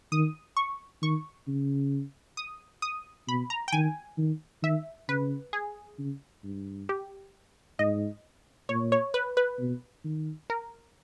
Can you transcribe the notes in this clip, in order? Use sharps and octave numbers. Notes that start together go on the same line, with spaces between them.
D#3 D#6
C#6
D#3 C#6
C#3
D#6
D#6
B2 B5
A#5
G5
D#3 G#5
D#3
D#3 E5
C#3 B4
G#4
C#3
G2
G4
G#2 D#5
A#2 C#5
C#5
B4
B4
B2
D#3
A#4